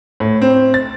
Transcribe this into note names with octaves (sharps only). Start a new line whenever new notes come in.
A2
C4
A6